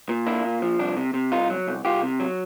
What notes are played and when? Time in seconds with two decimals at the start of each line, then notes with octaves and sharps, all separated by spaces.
0.09 A#2
0.26 A#3 D4 E4
0.45 A#2
0.62 F3
0.79 C2 D4
0.97 C3
1.14 C3
1.32 C2 D#4 F4
1.50 F#3
1.67 C2
1.85 C2 F4 G4
2.03 C3
2.20 F#3